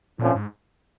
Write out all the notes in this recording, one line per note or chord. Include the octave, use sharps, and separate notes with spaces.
F2 A#2 D3 F3 A3 C#4
G#2